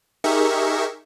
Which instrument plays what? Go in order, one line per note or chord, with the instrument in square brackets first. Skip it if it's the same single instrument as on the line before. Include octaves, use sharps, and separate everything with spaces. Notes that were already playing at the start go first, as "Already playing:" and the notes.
[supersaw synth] D#4 G4 G#4 A#4 E5 C#6